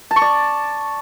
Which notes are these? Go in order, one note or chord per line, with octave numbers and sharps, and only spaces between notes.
A5
C#6
D5